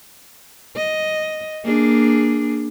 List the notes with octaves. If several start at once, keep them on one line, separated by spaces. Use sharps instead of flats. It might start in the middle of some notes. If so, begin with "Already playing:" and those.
D#5
A#3 D4 G#4